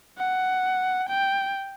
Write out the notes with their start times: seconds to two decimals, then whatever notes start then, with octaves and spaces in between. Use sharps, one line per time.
0.18 F#5
1.09 G5